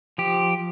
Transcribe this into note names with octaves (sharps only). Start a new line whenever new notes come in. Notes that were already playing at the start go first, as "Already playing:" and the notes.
F3 G4